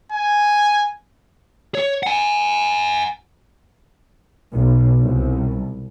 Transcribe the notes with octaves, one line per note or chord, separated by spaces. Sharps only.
G#5
C#5
F#5 G#5
B1
C2